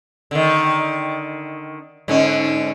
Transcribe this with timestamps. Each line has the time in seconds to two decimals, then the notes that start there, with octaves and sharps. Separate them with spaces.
0.31 D3 D#3
2.08 G#2 D3 C#4